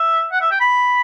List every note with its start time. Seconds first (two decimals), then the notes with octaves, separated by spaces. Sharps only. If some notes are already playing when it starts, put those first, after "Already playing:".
Already playing: E5
0.32 F#5
0.41 E5
0.51 G5
0.60 B5